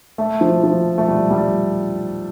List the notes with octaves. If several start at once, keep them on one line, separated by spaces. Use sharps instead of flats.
A3
F3
F3
A3
G3
G3